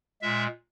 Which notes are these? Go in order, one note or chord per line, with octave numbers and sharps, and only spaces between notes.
A#2 G#3 E5